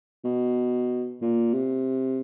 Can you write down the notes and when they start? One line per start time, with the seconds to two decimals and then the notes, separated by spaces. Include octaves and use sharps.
0.24 B2
1.21 A#2
1.53 C3